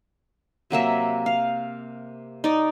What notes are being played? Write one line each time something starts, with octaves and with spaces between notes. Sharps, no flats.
C3 F#3 A#3 E5
F5
D#4 D5